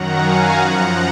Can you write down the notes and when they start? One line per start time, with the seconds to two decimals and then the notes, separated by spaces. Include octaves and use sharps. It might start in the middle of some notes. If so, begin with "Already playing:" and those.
Already playing: F#2 D#3 F#3 F#5 A#5
0.21 F5 G#5
0.58 F#2 F3 F#5 A#5